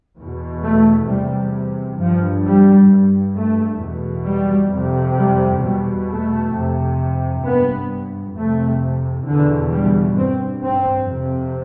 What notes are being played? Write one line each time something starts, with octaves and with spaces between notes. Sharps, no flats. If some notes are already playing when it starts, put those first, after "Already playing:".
E2 B2
A3
E2 C3 G3
G2 F3
G3
G2
A3
E2 B2
G3
F2 C3
G3
E2 B2 G3
A3
F2 C3
G2 B3
F2 C3 A3
E2 B2 D3
G3
G2 C4
C4
F2 C3